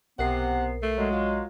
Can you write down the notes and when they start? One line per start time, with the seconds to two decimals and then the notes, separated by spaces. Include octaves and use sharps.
0.19 B1 C3 B3 A#4 F#5 C7
0.82 A3
0.98 F#3 G#3
1.12 F4